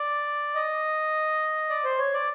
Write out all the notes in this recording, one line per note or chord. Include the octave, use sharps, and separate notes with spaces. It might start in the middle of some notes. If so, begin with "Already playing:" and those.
Already playing: D5
D#5
D5
C5
C#5
D5